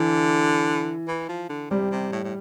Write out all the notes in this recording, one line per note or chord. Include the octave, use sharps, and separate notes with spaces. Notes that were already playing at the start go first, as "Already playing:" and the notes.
Already playing: D3 E3
E3
F3
D3
C3 G3
C3
A2
A2